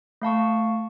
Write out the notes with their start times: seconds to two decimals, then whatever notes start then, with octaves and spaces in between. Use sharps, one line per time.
0.22 A3 F5 A5 C#6